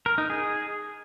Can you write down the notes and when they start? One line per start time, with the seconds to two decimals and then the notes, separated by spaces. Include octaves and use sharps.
0.06 A#4
0.18 D#4
0.30 G#4